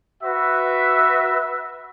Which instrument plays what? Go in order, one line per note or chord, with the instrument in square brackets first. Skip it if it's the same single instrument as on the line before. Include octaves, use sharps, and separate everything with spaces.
[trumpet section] F#4 B4 E5